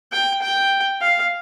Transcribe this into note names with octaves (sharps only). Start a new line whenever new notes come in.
G5
G5
F5